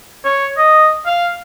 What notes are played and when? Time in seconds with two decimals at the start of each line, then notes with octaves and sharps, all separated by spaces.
0.25 C#5
0.58 D#5
1.06 F5